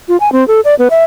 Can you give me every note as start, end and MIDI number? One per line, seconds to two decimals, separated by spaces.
0.08 0.17 65
0.20 0.32 80
0.32 0.46 60
0.48 0.60 69
0.65 0.75 74
0.79 0.88 59
0.90 1.04 76